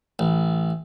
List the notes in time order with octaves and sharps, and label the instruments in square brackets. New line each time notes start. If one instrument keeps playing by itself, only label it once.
[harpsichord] A1